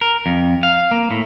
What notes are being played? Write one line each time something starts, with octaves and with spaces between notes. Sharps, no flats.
A#4
F2
F5
A#3
A2